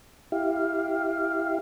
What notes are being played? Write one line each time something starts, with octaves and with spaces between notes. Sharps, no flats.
E4 G4 F5